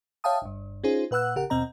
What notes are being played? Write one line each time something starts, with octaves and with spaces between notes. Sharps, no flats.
C#5 E5 F5 G5 A5 D#6
G1 G2
C#4 D#4 F4 G#4 C5
A#2 B4 F#5 E6 F#6
G#1 C#3 G4 A#4 F#5
D#2 B2 C4 D#5 A#5